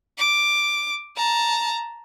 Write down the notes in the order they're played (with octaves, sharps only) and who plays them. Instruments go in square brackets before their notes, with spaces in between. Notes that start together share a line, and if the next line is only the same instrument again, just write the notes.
[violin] D6
A5 A#5